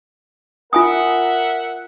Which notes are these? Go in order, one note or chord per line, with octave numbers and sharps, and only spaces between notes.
F4 A#4 E5 F#5 G#5 D#6